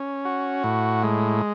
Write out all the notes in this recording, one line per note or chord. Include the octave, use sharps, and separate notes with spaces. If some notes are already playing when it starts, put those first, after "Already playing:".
Already playing: C#4
F#4
A2
G#3